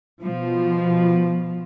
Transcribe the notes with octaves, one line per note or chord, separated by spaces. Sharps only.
B2 F3